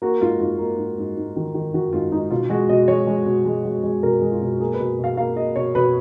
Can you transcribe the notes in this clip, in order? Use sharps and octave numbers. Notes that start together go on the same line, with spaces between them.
A#3 F#4
G#2 F4
G#2 F4
A#3
G#2
G#2
G#2
D#3
D#3
D#3 F#4
G#2 F4
G#2 D#4
B2 F4
G#3 F#4
B2 D#5
G#3 C#5
G#3
B2
G#3
G#3
G#3
B2 A#4
G#3
F4
B2
A#3 G#4
B4
B2
B2
F5
A#3 F5
A#3 D#5
B2 C#5
B2 B4